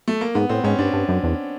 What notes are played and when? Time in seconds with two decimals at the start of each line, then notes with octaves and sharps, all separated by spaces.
0.08 A3
0.21 A#3
0.35 G#2 B3
0.49 A2 C4
0.64 G#2 C#4
0.79 G2 D4
0.93 G2
1.08 F#2
1.24 E2